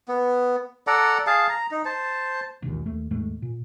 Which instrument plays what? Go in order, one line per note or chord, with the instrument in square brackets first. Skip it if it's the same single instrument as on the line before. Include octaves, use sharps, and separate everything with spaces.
[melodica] B3
A4 D5 F#5 A#5
G#4 F5 A5
A#5
D#4
C5 A5
[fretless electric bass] E1 A#1 D#2 A#2
D#2 A3
D#2 G#2 G#3 A3
A#2